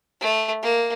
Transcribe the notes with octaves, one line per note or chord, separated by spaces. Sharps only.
A3
A#3